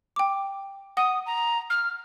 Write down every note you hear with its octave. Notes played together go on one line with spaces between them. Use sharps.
G5 D6
F#5 D#6
A#5
F6